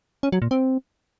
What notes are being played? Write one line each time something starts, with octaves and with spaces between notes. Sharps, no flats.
C#4
F#3
A#2
C4